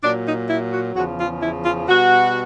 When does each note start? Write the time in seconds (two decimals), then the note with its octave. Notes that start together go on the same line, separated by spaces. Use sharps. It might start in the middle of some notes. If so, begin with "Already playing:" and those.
0.02 A#2 F#3 D4
0.25 D#4
0.49 E4
0.72 F#4
0.95 E2 C#3 F3 F#4
1.19 F4
1.41 E4
1.64 F4
1.88 B2 G3 F#4